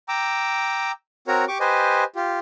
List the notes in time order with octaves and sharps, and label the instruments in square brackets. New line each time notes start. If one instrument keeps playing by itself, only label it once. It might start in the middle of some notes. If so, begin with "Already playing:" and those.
[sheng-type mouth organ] G5 A#5 D6 E6
C4 F#4 A#4 C#5 A#5
G4 C#6 D6
G4 B4 C5 D#5 G#5
F4 G4